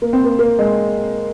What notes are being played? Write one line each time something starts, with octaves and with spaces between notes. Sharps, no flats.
A#3
C4
A#3
A#3
G#3